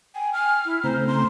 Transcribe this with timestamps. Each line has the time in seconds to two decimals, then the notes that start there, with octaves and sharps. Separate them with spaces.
0.15 G5 G#5
0.34 G#5 F6
0.65 E4
0.84 C#3 A3 C4 C5 A#5
1.07 C6